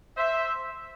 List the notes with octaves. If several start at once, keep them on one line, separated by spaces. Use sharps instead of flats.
C5 E5